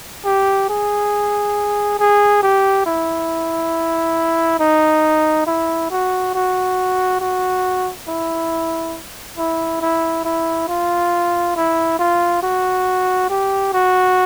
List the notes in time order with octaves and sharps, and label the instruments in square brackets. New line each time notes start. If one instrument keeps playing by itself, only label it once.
[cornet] G4
G#4
G#4
G4
E4
D#4
E4
F#4
F#4
F#4
E4
E4
E4
E4
F4
E4
F4
F#4
G4
F#4